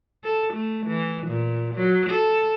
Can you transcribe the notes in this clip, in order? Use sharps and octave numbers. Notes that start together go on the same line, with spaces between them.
A4
A3
E3
A#2
F#3
A4